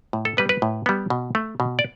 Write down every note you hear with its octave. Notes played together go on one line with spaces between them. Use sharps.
A2
A4
G3 B3 B4
B4
A2
G3 B3
B2
A3
B2
D5